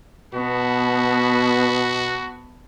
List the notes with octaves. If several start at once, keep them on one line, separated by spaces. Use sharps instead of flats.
B2 B3 F#4 A5